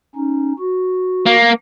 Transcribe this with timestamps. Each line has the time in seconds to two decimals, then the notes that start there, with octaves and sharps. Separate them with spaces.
0.16 C#4 D#4
0.59 F#4
1.26 A#3